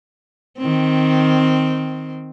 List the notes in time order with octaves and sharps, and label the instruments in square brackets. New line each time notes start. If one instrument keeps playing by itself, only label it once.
[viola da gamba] D#3 C4